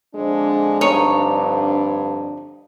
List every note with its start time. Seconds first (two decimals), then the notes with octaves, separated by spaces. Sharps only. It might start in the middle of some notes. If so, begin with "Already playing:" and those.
0.14 F2 D3 G#3 D4
0.81 G2 D#4 C#5 C#6